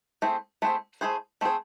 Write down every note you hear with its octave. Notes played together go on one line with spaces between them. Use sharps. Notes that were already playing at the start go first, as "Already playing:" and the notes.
A3 C4 E4 G#4 C5
A3 C4 E4 G#4 C5
A3 C4 E4 G#4 C5
A3 C4 E4 G#4 C5